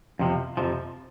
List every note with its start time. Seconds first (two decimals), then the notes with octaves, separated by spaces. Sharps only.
0.19 F2 C3 F3
0.57 F2 C3 F3